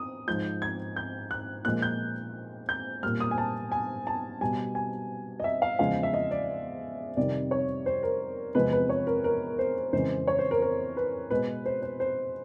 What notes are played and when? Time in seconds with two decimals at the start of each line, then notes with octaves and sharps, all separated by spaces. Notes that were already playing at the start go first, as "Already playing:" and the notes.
Already playing: D#6
0.27 G#2 F3 G#3 G6
0.62 G#6
0.96 G6
1.31 F#6
1.65 A#2 F3 G#3 F#6
1.82 G6
2.69 G6
3.03 A#2 G3 F6
3.20 D#6
3.31 G#5
3.38 A5
3.72 G#5
4.07 A5
4.41 B2 G3 G#5
4.75 G#5
5.40 D#5
5.44 E5
5.62 F5
5.79 E2 C#3 F3 G#3 F5
6.03 E5
6.14 D#5
6.31 D5
7.17 F2 C3 D#3 G3 D5
7.51 C#5
7.86 C5
8.03 A#4
8.55 E2 C3 F3 G#3 B4
8.73 B4
8.89 C#5
9.07 A#4
9.24 A#4
9.59 C5
9.93 F2 C#3 E3 G#3 C5
10.28 C#5
10.39 C5
10.51 A#4
10.62 A#4
10.97 B4
11.30 B2 G#3 B4
11.66 C5
11.82 C5
12.00 C5